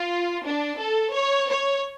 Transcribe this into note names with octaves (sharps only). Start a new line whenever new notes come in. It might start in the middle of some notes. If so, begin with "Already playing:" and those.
Already playing: F4
D4
A4
C#5
C#5